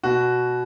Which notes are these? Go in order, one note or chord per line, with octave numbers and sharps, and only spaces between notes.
B2 F#4